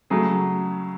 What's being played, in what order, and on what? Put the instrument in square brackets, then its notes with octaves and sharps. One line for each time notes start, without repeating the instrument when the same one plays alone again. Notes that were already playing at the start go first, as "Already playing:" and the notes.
[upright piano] C#3 F#3 A3 G#4